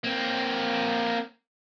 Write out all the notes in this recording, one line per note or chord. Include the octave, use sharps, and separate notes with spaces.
A#3 C4